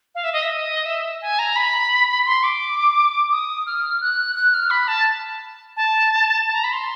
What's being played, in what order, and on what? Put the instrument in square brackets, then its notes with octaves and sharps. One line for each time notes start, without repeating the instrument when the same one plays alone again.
[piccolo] F5
E5
D#5
E5
D#5
E5
G#5
A#5
B5
C6
D6
D#6
F6
F#6
F#6
F6
B5
A5
A5
A5
A#5
B5
C6